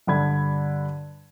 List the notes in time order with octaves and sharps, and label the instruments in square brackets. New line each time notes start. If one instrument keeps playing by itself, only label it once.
[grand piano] G2 D3 B5 G#6